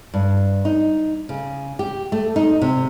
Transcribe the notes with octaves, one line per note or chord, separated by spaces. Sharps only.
G2
D#4
C#3
G4
A3
D#4
C3